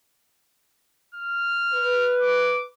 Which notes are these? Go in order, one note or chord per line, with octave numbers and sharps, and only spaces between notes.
F6
B4
D6